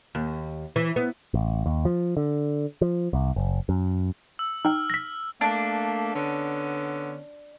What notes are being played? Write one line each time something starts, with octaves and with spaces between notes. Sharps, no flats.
D#2
E3
B3
A1
D#2
F3
D3
F3
C2
F#1
F#2
E6
D#4 G5 F6
A#6 B6
A3 A#3 D4
D3 B3 C#4